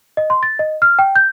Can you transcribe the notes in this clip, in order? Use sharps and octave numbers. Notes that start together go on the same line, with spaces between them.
D#5
C6
A6
D#5
F6
G5
G6